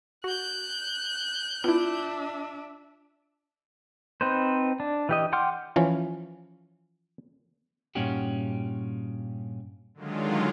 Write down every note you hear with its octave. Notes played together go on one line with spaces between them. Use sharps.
F#4 F#6 G6
B3 D4 E4 F4 E5
C4 D#4 B4 C5
D4
E3 G4 D#5
F#5 G5 C6 D6 F6
E3 F3 C#4
G2 A#2 C#4 D#4 F#4 G4
D3 D#3 F#3 G#3 F4